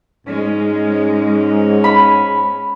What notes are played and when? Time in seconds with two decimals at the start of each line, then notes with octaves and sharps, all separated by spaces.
0.27 G#2 G#3 C#4
1.84 B5